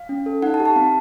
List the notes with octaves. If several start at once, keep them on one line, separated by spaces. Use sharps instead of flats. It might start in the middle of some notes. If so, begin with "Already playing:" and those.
Already playing: F5
C#4
A4
D#4 F#5
A5
G4
A5
C4 F5